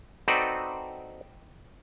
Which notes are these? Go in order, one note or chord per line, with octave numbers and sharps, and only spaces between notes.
C4 D#4 F#4 A4 B4 D5